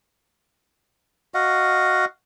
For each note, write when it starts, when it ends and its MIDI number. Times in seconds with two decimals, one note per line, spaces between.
1.34 2.05 66
1.34 2.05 75
1.34 2.05 77
1.34 2.05 78